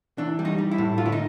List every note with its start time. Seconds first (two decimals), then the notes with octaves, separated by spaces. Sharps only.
0.18 E3 D4
0.39 G3
0.45 D#4
0.58 G3
0.71 E4
0.78 A2
0.98 D3 F4
1.05 E4
1.12 D#4